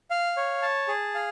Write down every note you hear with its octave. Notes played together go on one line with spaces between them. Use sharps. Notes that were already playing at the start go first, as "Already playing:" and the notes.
F5
C#5
A5
G#4
F5